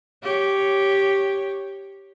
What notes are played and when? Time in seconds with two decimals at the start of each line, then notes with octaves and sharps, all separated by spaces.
0.23 G4 C#5